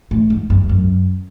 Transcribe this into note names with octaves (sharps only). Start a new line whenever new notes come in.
A2
G#2
G2
F#2